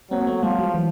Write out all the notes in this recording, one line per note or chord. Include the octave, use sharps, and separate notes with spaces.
F#3 A#3 C4
A3 B3
F3 G3 A3
F#3 G#3
E3 F#3